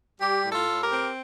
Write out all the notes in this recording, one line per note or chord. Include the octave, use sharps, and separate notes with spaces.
G3 G4
A2
F4 A4
A2
G4 A#4
C4